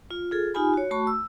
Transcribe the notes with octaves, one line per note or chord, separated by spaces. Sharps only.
F4
F4 G#4 A4
D#4 F4 G4 G#5 B5
F#4 C#5
A3 F#4 A5 B5 C#6
E6